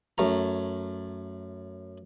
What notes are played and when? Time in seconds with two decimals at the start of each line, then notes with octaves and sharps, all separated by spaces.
0.18 F#2 A3 A#5